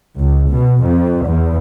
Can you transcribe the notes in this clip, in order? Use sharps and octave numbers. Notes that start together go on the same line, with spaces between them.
C#2
B2
F2
E2